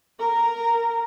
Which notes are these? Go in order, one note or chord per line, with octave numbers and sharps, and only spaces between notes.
A#4 A#5